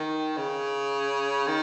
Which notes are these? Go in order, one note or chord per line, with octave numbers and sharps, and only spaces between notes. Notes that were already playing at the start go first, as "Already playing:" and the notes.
Already playing: D#3
C#3
D#3